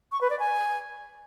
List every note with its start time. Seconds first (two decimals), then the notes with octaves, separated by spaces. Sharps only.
0.12 C#6
0.21 B4
0.30 D5
0.39 G#5